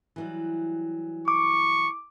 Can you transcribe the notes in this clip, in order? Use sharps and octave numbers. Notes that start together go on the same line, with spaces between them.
E3 F#3 G3
C#6 D6